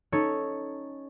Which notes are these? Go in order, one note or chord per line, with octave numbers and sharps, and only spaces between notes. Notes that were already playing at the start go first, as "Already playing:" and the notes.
C#4 D#4 A4 C#5